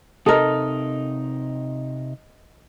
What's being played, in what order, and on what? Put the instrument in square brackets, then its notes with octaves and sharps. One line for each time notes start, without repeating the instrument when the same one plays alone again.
[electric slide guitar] C3 D#4 [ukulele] A4 A#4 [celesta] D#5 D#6